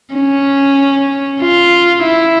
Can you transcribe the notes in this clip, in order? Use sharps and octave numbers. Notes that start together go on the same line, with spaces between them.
C#4
F4
E4